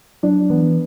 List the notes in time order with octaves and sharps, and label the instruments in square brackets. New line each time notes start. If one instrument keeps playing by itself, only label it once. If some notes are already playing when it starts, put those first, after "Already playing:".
[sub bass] F#3 [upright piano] D4
[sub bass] E3 [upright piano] B3